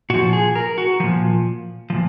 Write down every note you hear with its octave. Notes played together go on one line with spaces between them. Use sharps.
A#2 F3 F#4
G#4
A#4
F#4
A#2 F3
A#2 F3